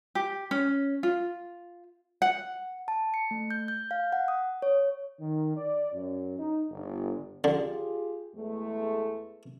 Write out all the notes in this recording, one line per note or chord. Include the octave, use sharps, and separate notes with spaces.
G4
C#4
F4
F#5
A5
C#7
A3
G6
G6
F5
F#5
D#6
C#5
D#3
D5
F#2
D#4
G1
D3 F4 G4 G#4
E2 G#3 A3